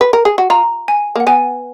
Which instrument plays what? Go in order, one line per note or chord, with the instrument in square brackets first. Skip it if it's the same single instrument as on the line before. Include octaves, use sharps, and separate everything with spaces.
[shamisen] B4
A#4
G#4
F#4
[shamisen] F4 [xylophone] A#5
[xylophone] G#5
[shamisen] A#3 [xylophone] F#5
[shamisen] B3 [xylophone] G#5